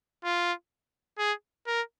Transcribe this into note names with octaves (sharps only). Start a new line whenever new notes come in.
F4
G#4
A#4